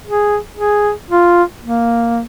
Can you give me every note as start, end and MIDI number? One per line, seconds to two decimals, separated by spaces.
0.06 0.38 68
0.57 0.92 68
1.10 1.43 65
1.62 2.23 58